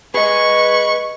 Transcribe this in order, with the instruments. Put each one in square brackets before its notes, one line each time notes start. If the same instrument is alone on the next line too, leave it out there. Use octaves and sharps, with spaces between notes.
[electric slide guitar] G#4 D#5 [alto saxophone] B4 [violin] C#6